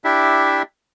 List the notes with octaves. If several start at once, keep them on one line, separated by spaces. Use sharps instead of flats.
D4 E4 G4 E5